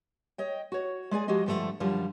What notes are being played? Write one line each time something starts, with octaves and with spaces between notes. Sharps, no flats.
C#5 D#5 G5
F#4 C#5
G#3 G#4 D5 G#5
F3 G#3 F#4 G4 D#5
G2 D3 F3 G3 A3
F#2 D3 F3 G3 F4